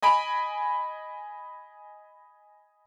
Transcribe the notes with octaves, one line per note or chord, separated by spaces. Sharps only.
D#5 G#5 B5 D7